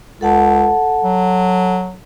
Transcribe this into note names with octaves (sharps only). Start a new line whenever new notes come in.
C#2 A4 F#5 A5
F#3